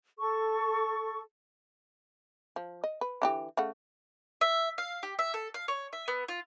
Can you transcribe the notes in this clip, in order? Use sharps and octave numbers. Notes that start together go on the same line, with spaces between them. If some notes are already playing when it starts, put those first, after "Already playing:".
A4 C#6
F3
D#5
B4
D3 E3 G4
C#3 A3 F#5
E5
F5
G4
E5
A4
F5
C#5
E5
B3
F4